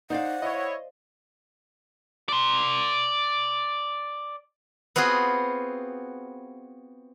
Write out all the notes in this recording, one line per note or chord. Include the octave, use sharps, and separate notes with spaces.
D#4 C5 D5 F5 F#5
E4 C#5 D#5
D5 C6
B3 C4 F4 F#4 G#4